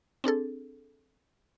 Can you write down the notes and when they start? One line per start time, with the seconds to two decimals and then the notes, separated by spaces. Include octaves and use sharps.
0.24 C4 D4 G#4 A4